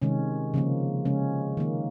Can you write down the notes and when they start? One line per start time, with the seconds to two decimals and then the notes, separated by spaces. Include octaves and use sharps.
0.02 C3 D#3 G#3 C#4
0.54 C#3 F3 A#3
1.05 C#3 G#3 C#4
1.57 D#3 A#3